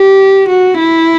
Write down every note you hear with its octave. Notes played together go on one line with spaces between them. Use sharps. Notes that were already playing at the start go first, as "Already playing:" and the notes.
Already playing: G4
F#4
E4